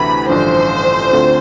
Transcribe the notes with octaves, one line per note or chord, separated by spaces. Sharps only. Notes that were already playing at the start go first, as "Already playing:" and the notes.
Already playing: D2 C3 E3 B5
A1 G2 D3 F3 C5
D2 D3 A3 C4 F4